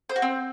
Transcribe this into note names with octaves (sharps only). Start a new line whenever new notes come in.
C5
F#4
C4